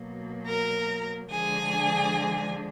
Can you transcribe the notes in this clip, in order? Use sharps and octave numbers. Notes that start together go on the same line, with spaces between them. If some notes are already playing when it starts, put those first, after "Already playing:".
Already playing: B2 F#3 A#3
A#4 A#5
D3 F3 G#3 D4 G#4 G#5